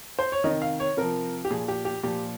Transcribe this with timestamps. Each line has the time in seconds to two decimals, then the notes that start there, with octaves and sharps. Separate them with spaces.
0.19 C5
0.32 C#5
0.44 C3 D#3 D#5
0.62 F5
0.80 C#5
0.97 C3 F3 A#4
1.45 G4
1.50 A#2 F3 G#4
1.68 G4
1.85 G4
2.03 A#2 F3 G4